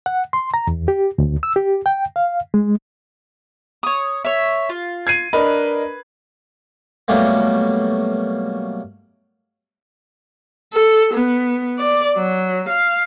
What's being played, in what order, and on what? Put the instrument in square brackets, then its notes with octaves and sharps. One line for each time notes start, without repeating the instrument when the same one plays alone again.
[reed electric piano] F#5
C6
A#5
E2
G4
D2
E6
G4
G5
F5
G#3
[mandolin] C#5 D#6
C#5 E5
F4
[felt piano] G#6 C7 D#7
[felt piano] D4 A#4 D#5 [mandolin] B4
[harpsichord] B2 F#3 G3 A3 A#3
[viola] A4
B3
D5
F#3
F5